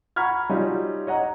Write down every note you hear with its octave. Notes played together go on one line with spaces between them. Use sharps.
F#5 A#5 B5 C#6 F6 G#6
G3 C#4 D#4 F4 F#4
C#5 D#5 F#5 A#5